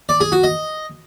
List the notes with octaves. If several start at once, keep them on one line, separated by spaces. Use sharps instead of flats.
D5
G#4
F#4
D#5